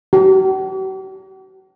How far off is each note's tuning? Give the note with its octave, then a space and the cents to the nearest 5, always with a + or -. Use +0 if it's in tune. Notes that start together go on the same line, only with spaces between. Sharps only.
F#4 +45